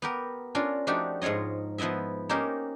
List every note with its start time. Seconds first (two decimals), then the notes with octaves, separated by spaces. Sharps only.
0.02 B3 G4 A#4
0.55 C#4 D4 F4 A#4
0.87 F3 A3 D4 D#4 F#4 G4
1.22 G#2 F3 F4 C#5 D#5
1.78 F3 B3 E4 D#5 E5
2.29 A#3 C#4 D#4 G4 A#4 C5